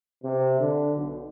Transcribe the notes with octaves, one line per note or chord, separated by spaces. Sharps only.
C3
D3
B1